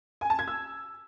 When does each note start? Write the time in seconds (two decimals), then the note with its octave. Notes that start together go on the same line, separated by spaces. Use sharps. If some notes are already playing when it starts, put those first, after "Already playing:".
0.21 G#5
0.30 A5
0.39 G#6
0.48 E6